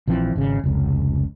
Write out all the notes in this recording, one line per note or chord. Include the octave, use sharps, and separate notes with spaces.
A#1 E3 F3 C4
G#1 C#3
F1 C#2